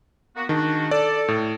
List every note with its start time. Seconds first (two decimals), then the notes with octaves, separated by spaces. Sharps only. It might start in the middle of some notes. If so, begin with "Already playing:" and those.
0.36 A#3 B3 F#4
0.49 D#3 G#3 D4 F#4
0.91 A4 D5
1.28 A2